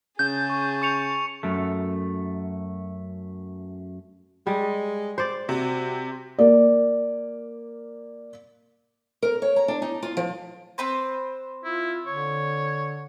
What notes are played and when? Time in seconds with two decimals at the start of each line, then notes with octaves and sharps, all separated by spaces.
0.19 C#3 G#4 A5 G6
0.50 C#6
0.82 C#6 C#7 F7
1.43 F#2 A3
4.47 G3 G#3
5.18 C5 D5
5.49 C3 F#4
6.39 A#3 D5
9.22 A#4
9.42 C#5
9.56 A#5
9.68 D4
9.82 D#4
10.03 F4
10.17 F3
10.78 C4 B4 C5
11.64 E4 F4
12.06 D3 C#5